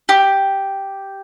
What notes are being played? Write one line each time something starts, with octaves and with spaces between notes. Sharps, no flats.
G4